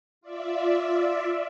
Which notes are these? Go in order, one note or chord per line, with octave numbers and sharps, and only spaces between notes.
F4 D5 E5